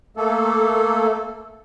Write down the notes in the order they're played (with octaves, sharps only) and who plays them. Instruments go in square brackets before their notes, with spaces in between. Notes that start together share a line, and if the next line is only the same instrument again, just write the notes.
[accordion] A3 A#3 A4